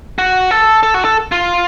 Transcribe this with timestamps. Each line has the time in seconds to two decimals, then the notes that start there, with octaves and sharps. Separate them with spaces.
0.18 F#4
0.51 A4
0.83 A4
0.94 F#4
1.05 A4
1.32 F4